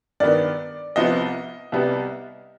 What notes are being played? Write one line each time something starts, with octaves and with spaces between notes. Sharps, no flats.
G2 D#3 B3 D5
C2 C3 F3 B3 D#5
C2 C3 G3 B3